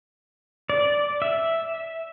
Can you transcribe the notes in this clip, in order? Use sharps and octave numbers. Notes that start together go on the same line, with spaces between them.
D5
E5